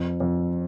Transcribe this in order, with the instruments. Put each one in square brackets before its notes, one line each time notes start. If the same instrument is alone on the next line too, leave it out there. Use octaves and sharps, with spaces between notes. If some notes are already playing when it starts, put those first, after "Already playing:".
Already playing: [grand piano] F2
F2